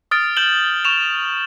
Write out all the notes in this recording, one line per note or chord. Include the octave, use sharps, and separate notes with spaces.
D#6 F6 A6 D7
F6 G6 E7 F#7 G7
C#6 E7 F7